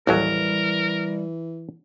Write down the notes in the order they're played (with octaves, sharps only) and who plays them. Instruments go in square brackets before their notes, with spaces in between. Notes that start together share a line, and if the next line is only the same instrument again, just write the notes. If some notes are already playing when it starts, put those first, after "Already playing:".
[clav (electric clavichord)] A1 D#2 F#3 [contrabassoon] E3 [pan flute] G3 [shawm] A#4